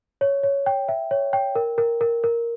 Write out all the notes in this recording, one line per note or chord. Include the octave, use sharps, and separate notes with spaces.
C#5
C#5
G5
E5
C#5
G5
A#4
A#4
A#4
A#4